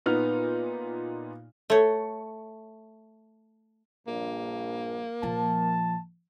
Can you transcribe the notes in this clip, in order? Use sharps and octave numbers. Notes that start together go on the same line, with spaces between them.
A#2 B3 D#4 F6
A3 C#5
A#1 G2 A#3
A#2 F3 A5